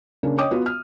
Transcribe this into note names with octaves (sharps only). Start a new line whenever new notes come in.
C#3 A#3 C#4 D4
C#5 D#5 G5 D6 D#6
B3 F4 F#4
F6